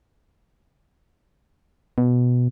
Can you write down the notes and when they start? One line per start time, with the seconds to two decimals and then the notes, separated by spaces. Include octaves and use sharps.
1.98 B2